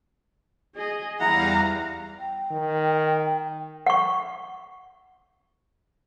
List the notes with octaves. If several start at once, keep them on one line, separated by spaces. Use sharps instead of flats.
G#4 D#5
E2 G3 E4 F5 F#5 A#5
G5
D#3
F#5 C#6